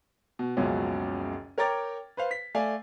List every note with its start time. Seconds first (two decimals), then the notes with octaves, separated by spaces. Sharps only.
0.39 B2
0.57 F#1 C#2 F#2 B2 F3 C#4
1.58 A#4 C#5 G5 A#5 D6 A6
2.17 B4 C5 F5
2.31 B6
2.55 A3 D5 F5 G#5